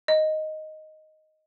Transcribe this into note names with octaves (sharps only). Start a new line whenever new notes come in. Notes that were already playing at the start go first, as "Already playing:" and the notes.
D#5